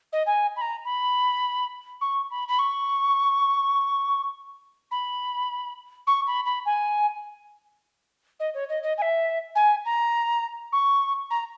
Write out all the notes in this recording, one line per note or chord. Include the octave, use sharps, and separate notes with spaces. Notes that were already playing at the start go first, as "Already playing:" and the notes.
D#5
G#5
B5
A#5
B5
C#6
B5
B5
C#6
B5
C#6
B5
B5
G#5
D#5
C#5
D#5
D#5
G#5
E5
G#5
A#5
C#6
A#5